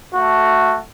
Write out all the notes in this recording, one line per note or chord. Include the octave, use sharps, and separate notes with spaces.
A3 F#4